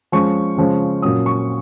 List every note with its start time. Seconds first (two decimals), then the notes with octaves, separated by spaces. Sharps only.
0.12 F3 G#3 C#4 C#6
0.57 C#3 F3 G#3 C#4
1.02 A#2 F#3 C#4 D#6
1.26 C#6